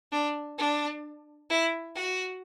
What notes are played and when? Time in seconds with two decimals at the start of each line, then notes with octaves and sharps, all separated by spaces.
0.12 D4
0.58 D4
1.50 E4
1.95 F#4